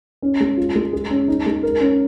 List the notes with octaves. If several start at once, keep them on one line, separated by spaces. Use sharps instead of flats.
C#4
G#3
F4
G#3
G#4
C#4
D#4
G#3
A#4
C#4